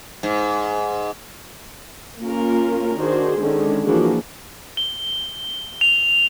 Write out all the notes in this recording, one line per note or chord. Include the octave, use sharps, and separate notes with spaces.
G#2
A#3 C#4 F4 A#4
D#3 D4 F#4 G#4 C5
D3 D#3 G#3 C#4 D4
E3 F3 A#3 D4 F#4 G#4
G7
F7